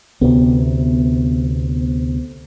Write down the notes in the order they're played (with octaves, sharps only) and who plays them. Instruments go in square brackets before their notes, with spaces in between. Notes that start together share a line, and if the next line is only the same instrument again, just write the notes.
[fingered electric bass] D2 C3 [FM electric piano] B3